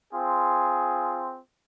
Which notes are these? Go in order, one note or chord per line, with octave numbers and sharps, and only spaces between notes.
C4 F4 G#4